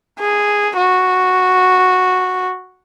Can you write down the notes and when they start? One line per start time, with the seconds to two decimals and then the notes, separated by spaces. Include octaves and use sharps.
0.20 G#4
0.77 F#4